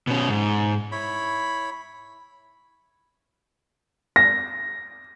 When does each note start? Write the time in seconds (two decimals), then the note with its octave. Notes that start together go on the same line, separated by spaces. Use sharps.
0.07 B2 C#4
0.29 G#2
0.92 E4 C#5 B5
4.16 A#6